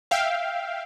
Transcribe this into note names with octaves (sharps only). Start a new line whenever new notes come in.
E5 F5 G5